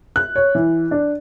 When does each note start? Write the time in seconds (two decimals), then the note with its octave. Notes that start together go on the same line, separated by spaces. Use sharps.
0.16 F#6
0.36 C#5
0.55 E3
0.91 D4